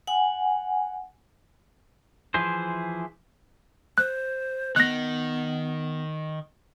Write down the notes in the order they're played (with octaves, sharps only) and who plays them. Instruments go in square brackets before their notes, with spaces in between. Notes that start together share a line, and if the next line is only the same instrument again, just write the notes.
[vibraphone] F#5 G#5
[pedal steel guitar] E3 F3 E4 G#4 C5
[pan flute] C5 [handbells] F#6
[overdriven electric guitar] D#3 [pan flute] B3 [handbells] F#6 A#6